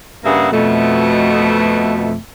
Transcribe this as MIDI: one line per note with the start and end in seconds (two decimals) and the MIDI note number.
0.24 0.51 43
0.24 0.51 49
0.24 0.51 58
0.24 0.51 68
0.24 0.51 76
0.24 0.51 78
0.51 2.15 41
0.51 2.15 47
0.51 2.15 57